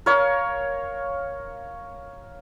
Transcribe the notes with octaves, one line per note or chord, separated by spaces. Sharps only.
A#4 C#5 F5